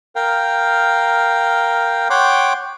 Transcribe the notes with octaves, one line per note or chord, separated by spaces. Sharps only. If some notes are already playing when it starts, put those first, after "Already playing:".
A#4 F5 G5
C#5 F#5 G5 C6 D6